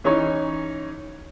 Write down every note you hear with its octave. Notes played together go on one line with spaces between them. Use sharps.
E3 C#4 D#4 C#5